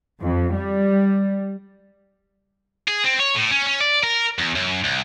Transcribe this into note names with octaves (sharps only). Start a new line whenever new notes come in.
F2
G3
G#4
C4
C#5
A2
C#4
C#4
D5
A#4
E2
F#2
C2